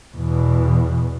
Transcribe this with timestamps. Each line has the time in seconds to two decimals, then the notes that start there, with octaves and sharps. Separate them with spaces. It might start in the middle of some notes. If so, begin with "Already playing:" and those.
0.17 E2 B2